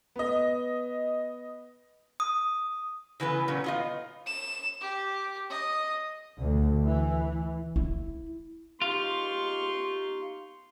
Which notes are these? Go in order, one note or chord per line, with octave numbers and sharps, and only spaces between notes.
B3 D#5
D#6
C#3 E3 B3 B4
A#2 F#3 C#4
B3 F4 D#5
E7
G4
D#5
D2
E3
E4
D#4 F4 G4 C6 C#6